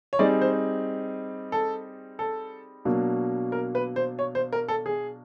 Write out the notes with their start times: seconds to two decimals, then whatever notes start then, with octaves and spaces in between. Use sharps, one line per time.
0.13 C#5
0.19 G3 C4 D#4 G#4 D5
0.42 C5
1.52 A4
2.19 A4
2.85 B2 F#3 A#3 D4
3.52 A#4
3.75 B4
3.96 C5
4.19 C#5
4.35 C5
4.53 A#4
4.68 A4
4.86 G#4